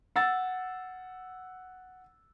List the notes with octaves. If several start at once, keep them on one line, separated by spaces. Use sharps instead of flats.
F#5 E6 A6